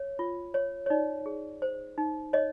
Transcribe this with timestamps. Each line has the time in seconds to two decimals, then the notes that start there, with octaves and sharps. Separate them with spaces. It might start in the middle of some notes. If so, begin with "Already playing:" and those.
Already playing: C#5
0.19 F4
0.54 C#5
0.86 C#5
0.90 D#4 D5
1.26 G#4
1.62 C5
1.98 D#4
2.33 C#5 D#5